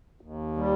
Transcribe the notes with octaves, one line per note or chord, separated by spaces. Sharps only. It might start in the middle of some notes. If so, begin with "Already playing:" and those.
D#2
G3